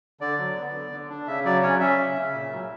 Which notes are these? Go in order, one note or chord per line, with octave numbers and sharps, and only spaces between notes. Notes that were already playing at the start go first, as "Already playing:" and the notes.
D3 D5
F#3
B3
D3
D3
D4
C#3 E5
F#3 D5
C#4 C#5
C#4 E5
C#3
C#3
A#2
F#3